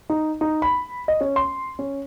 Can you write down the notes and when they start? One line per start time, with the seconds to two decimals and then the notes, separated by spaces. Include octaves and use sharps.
0.10 D#4
0.41 D#4
0.62 B5
1.08 D#5
1.21 C#4
1.36 C6
1.79 C#4